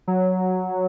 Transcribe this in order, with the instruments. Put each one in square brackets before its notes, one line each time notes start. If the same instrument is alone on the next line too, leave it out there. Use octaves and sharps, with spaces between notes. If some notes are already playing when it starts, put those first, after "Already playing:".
[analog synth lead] F#3